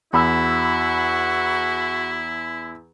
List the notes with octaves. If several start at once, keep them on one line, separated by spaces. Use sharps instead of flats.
E2 E4 F#4 B5 E6